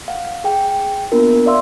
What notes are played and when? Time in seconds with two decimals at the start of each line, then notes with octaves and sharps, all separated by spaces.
0.08 F5 F#5
0.44 G#4 G5
1.12 A#3 B3 D4 F4 A#4
1.46 D5 E5 F5 C6 E6